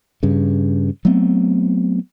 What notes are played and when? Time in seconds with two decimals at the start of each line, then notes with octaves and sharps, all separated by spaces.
0.23 G2 C#3
1.05 F#3 A3 B3 C4